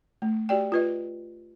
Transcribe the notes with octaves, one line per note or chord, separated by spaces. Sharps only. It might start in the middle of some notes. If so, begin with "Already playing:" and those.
A3
F#4 G4 D5 G5
F4 B4 D#5